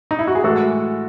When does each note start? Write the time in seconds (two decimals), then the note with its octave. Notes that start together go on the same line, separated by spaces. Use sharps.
0.11 D#4
0.19 E4
0.27 F#4
0.35 G#4
0.43 A2 E3 G#3 F#4 A4